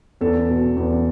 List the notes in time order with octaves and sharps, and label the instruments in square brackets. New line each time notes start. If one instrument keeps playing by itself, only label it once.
[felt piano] E2 A4
B2
E2